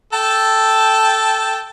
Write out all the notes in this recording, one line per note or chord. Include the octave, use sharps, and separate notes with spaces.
A4 G5 A5